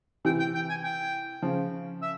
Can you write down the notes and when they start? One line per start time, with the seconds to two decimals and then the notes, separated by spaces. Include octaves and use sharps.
0.25 C3 E3 G5
0.39 G5
0.55 G5
0.69 G#5
0.84 G5
1.42 C#3 F3
2.02 E5